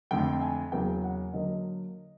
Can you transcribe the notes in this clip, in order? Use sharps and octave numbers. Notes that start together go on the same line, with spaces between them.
F2 D3 F3 A3 G5
G#5
E2 C#3 F#3 A#3 G5
F#5
D3 F#3 A#3 D#5